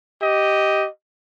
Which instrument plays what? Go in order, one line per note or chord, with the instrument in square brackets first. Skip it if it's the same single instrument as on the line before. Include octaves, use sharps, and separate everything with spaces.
[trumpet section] G4 D#5